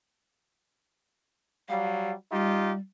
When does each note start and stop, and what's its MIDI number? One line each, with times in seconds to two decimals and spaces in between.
1.69 2.13 54
1.69 2.13 55
1.69 2.12 77
2.32 2.79 55
2.32 2.73 63
2.32 2.73 65
2.32 2.73 67